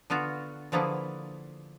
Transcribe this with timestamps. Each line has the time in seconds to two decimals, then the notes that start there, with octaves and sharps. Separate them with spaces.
0.10 D3 B3 F4 F#4
0.72 D3 F3 A#3 B3 E4 G#4